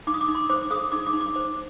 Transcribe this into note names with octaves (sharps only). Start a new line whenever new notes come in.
D#4 D6
D#6
D6
D#4
C6
C5 D6
G#4 D#6
D#4 D6
D6
D#4
D6
C5